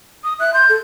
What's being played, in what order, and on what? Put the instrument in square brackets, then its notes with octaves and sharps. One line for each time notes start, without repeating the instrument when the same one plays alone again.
[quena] D#6
[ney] E5 [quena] F#6
[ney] C6 [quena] G6
[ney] A4